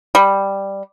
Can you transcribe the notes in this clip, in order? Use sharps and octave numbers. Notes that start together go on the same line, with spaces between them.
G3